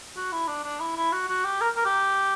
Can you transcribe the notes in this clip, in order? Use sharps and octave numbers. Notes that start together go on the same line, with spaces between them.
F#4
E4
D4
D4
E4
E4
F#4
F#4
G4
A#4
A#4
G4